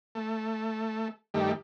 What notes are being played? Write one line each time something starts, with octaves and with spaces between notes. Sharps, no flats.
A3
G2 D#3 G3 A3